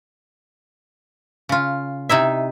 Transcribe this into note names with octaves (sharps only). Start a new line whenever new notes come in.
C#3 F4
C3 D#4 E4 E5